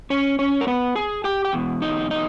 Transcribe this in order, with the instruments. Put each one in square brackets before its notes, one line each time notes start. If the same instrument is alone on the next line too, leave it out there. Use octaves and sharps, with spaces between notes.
[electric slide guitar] C#4 C#5
C#4 C#5
A#4
B3 B4
G#4 G#5
G4 G5
G5
E2 B2
D#4 D#5
D#4 D#5